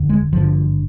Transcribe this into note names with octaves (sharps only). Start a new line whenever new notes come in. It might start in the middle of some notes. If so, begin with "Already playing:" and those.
Already playing: F1 D#2 D3
G#3
G#1 G2 D3 F3